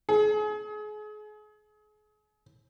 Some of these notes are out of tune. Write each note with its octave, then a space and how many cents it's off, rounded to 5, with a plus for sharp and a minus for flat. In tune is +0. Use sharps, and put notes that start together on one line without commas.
G#4 +35